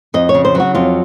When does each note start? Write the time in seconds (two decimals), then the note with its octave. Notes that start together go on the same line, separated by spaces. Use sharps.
0.14 F2 D#5
0.29 C#5
0.34 C#3
0.45 C5
0.55 F#3 F#4
0.75 F2 F4